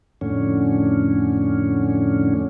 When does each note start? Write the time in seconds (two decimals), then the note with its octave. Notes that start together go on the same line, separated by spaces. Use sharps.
0.21 F2 A2 D3 C#4